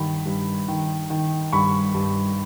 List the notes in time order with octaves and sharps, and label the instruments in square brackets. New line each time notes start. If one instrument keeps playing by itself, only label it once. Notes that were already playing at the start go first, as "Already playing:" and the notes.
Already playing: [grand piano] G2 D#3 B5
G2
D#3
D#3
G2 B5 C#6
G2